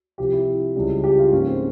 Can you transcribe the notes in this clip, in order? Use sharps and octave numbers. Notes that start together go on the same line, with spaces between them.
C2 C3 F3 G4
E4
C#2 C#3 G3
G4
F4
G#2 F3 A#3 C#4
C4